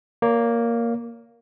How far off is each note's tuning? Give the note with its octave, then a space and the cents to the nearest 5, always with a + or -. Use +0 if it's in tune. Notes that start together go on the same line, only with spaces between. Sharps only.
A#3 +0 C#5 +35